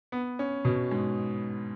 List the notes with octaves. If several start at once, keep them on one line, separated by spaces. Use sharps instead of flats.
B3
C#4
B2
G#2